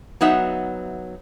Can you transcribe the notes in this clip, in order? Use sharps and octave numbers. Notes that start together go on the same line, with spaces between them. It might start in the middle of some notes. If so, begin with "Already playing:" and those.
F#3 B3 D#4 E5 F#5